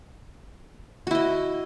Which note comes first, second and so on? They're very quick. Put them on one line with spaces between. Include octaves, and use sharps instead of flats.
F#4 E4 D#5